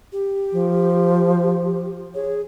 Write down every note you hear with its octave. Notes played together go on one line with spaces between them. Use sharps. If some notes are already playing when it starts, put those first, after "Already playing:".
G4
F3
G#4 C#5